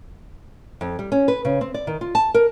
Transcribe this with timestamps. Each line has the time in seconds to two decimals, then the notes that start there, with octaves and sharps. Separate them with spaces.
0.81 F2
0.99 G3
1.12 C#4
1.28 B4
1.45 C#3
1.61 C4
1.74 D5
1.87 D#3
2.01 F4
2.15 A5
2.34 A#4